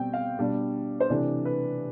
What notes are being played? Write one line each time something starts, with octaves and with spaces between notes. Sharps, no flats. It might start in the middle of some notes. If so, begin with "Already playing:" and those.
Already playing: B2 G3 C4 G5
F5
B2 G3 D4
C5
C3 E3 A3 D4 D5
B4